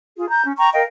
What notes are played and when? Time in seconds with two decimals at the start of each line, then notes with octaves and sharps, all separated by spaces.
0.17 F4 G#4
0.29 A#5 G6
0.45 C#4
0.58 G5 A#5 C#6
0.73 A#4 D#5 F5 G5